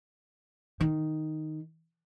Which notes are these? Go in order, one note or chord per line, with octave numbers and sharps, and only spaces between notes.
D#3